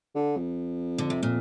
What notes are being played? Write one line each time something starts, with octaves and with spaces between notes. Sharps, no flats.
D3
F2
D3
C3
A#2